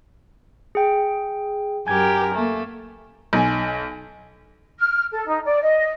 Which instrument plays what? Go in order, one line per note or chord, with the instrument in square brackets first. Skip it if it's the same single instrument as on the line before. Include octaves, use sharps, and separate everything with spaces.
[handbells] G#4 G5
[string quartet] F#2 G4 A#4 [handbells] G#5 G#6
[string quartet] A3 A#3
[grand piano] B1 G#5
[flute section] F6
A4
D#4
D5
D#5